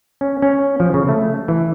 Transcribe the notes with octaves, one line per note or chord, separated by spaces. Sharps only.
C#4
C#4
F3
C#3
A3
E3